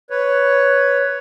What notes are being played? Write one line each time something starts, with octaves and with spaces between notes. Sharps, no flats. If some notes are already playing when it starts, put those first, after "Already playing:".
B4 C#5